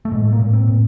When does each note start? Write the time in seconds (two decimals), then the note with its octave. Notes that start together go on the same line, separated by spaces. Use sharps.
0.05 A3
0.12 A2 G#3
0.33 A#3
0.39 A2
0.53 C4
0.67 A2